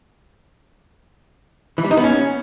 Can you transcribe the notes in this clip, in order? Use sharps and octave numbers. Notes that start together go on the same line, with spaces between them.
E3
G3
D#4
B3
C#4